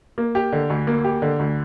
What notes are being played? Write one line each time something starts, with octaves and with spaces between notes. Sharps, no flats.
A#3
G4
D3
D2
A#3
G4
D3
D2